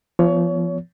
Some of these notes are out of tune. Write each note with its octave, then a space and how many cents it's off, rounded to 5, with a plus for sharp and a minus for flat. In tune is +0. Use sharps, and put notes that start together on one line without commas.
F3 -25 B3 +0 C#5 +30